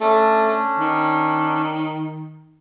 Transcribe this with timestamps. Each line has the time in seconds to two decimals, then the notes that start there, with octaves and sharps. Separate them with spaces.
0.01 A3 C#4 D4
0.79 D#3